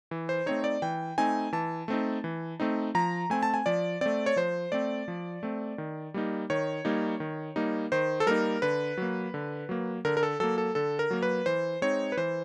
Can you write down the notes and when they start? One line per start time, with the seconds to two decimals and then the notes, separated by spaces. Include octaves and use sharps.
0.11 E3
0.29 C5
0.46 A3 C4 D#4 C#5
0.64 D5
0.82 E3 G5
1.18 A3 C4 D#4 G#5
1.53 E3 A5
1.88 A3 C4 D#4
2.24 E3
2.60 A3 C4 D#4
2.95 F3 A#5
3.30 A3 C4 G#5
3.43 A5
3.54 G#5
3.66 F3 D5
4.01 A3 C4 D5
4.26 C#5
4.36 F3 C5
4.72 A3 C4 D5
5.08 F3
5.43 A3 C4
5.78 D#3
6.14 G3 A#3 D#4
6.50 D#3 C#5
6.85 G3 A#3 D#4
7.20 D#3
7.56 G3 A#3 D#4
7.92 D#3 C5
8.20 A4
8.27 G3 A#3 D#4 A#4
8.62 D3 B4
8.97 F#3 A#3
9.34 D3
9.69 F#3 A#3
10.05 D3 A#4
10.17 A#4
10.23 A4
10.40 F#3 A#3 A4
10.58 A4
10.75 D3 A4
10.99 A#4
11.11 F#3 A#3
11.23 B4
11.46 E3 C5
11.82 G#3 C4 D#4 C#5
12.12 B4
12.17 E3 C5